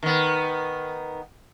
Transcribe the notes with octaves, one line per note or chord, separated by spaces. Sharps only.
D#3 B3